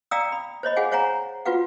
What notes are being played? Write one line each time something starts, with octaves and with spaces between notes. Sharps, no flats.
D5 F5 G5 A#5 D#6 E6
B5
C5 C#5 D#5 B5
G#4 F5 F#5 G#5
C5 C#5 F5 F#5 G#5 A#5
F4 F#4 B4 F5 F#5